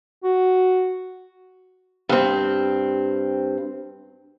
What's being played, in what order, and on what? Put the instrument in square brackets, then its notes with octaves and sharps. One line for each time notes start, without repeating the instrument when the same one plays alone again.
[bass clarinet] F#4
[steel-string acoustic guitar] G2 C4